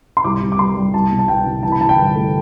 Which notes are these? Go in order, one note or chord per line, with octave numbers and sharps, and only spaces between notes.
C6
C2 D6
C2
D6
G3 C6
G3
C2 A5
B2
A5
C2 G5
C2
E3 A5
B5
E3 A5
G5
G1
A3